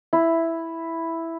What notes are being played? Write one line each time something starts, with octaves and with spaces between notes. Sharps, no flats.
E4